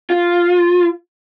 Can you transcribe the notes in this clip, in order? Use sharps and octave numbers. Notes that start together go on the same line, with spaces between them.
F4